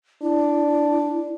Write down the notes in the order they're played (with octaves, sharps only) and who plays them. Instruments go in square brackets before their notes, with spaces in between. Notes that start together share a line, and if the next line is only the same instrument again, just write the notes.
[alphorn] D4 [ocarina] E4